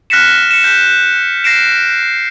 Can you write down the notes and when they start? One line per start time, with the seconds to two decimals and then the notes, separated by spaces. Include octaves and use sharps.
0.10 F6 F#6 A#6 B6 C#7 E7
0.51 C#7 E7
0.64 G6 B6
1.44 A#6 C7 D7 E7